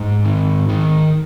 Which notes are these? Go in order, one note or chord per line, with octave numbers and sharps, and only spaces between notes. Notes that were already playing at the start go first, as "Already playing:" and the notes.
Already playing: G#2
D#3
D#3